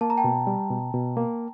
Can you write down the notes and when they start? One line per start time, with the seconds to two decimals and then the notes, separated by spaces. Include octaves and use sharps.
0.01 A#3 A5
0.10 A#5
0.17 G5 A5
0.24 B2
0.47 G3
0.70 B2
0.94 B2
1.17 A#3